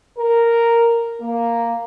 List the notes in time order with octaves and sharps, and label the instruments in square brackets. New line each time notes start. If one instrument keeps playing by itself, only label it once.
[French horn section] A#4
A#3